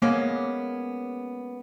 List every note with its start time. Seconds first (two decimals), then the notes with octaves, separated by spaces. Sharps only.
0.02 G#3 A#3 B3 C#4